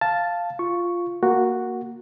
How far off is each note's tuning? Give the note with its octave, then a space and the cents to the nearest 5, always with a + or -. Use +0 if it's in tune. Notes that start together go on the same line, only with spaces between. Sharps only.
F5 +0 A5 +0
F4 +0 C#6 +0
A#3 +0 F#4 +0